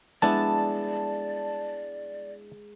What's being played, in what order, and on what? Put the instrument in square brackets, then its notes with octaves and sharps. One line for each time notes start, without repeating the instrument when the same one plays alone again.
[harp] G#3 [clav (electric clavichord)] B3 D4 E4 [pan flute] D5 [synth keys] A5